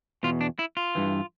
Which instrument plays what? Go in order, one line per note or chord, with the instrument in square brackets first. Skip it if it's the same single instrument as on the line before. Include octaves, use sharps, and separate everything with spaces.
[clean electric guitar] E2 B2 F4
D4
E4
F4
G2 E3